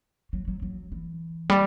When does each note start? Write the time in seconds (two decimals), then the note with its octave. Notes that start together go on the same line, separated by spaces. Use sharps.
0.33 F#3
0.48 F#3
0.62 F#3
0.92 E3
1.50 G3